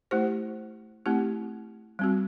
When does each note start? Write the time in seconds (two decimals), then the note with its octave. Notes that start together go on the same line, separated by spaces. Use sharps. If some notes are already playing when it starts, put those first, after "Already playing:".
0.11 A3 E4 G4 C5
1.06 A3 C4 E4 G4
1.99 G3 C4 F#4